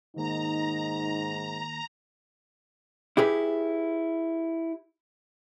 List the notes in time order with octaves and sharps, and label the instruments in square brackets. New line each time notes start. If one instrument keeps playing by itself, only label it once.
[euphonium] G#2 [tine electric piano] D#3 A#3 [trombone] D#4 [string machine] A#5
[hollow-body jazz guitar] E4 G4 G#4 B4